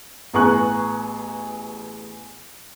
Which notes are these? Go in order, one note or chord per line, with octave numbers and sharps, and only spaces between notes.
A1 B3 G#4 A#5 C#6 F#6